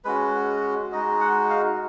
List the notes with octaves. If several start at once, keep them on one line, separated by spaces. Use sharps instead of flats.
G#3 C#4 F#4 B4
G#3 D#4 F#4 D#5
F#5
F5